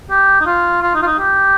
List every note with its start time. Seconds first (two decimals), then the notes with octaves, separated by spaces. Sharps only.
0.11 G4
0.41 D#4
0.46 F4
0.82 F4
0.95 D#4
1.03 F4
1.06 D#4
1.19 G4